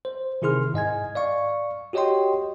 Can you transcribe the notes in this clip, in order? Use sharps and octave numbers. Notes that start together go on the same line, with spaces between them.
C5
C3 D#3 E4 G#4 C6 F6
G#2 D#5 G#5 G#6
D5 F5 C#6
F#4 G4 C#5 D#5 G5 C6